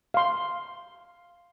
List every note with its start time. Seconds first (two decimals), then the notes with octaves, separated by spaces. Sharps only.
0.14 F5 C6